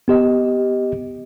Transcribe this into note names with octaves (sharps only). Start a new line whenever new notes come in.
B3 G4 D#5